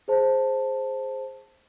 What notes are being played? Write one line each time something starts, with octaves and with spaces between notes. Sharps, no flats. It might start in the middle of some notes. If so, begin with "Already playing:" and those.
G#4 C5 A5